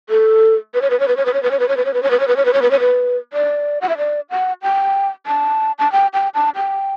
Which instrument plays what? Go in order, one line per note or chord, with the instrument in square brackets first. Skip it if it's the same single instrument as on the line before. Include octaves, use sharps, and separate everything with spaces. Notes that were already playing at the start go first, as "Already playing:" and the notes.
[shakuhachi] A4
B4
C#5
B4
C#5
B4
C#5
B4
C#5
B4
C#5
B4
C#5
B4
C#5
B4
C#5
B4
C#5
B4
C#5
B4
C#5
B4
C#5
B4
D5
F#5
E5
D5
F#5
G5
A5
A5
G5
G5
A5
G5